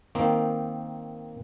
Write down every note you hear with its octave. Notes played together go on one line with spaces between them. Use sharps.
D#3 A#3 C4 D#4